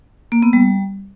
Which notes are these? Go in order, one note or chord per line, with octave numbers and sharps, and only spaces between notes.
A#3
B3
G3